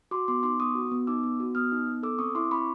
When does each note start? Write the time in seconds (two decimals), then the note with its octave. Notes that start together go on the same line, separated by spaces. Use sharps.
0.11 F#4 C6 D6
0.28 B3 C6 D6
0.43 D#4 C6 D6
0.60 B3 C#6 D#6
0.75 F#4
0.91 B3
1.07 D#4 D6 E6
1.24 B3
1.40 F#4
1.55 B3 D#6 F6
1.72 D#4
1.87 B3
2.03 A4 D6 E6
2.19 C4 C#6 D#6
2.35 E4 C6 D6
2.51 C4 B5 C#6